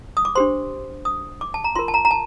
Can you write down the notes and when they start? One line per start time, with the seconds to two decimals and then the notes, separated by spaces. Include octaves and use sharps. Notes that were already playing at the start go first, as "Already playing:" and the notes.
0.17 D#6
0.25 D6
0.35 D4 G4 C5 C6
1.05 D#6
1.41 D6
1.54 A5
1.64 A#5
1.75 F4 A#4 C6
1.88 A5
1.94 A#5
2.05 A#5
2.11 A5